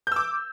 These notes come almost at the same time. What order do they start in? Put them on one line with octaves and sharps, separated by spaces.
G6 E6 D6